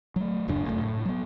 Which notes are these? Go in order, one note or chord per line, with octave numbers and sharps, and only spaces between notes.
F#3 A3
D1 F#2 C#3 D4
F1 F#2 A3
A2
F#3 B3